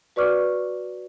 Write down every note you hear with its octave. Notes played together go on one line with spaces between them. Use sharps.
F#4 B4 D5 C#6 D6 F6